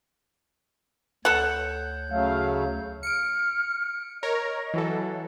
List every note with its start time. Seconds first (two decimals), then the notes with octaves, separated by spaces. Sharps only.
1.25 D2 A4 C#5 F#5 G6
2.10 C#3 F#3 A3 F5
3.03 F6 C#7 D7
4.23 A#4 C#5 D#5
4.74 E3 F#3 A4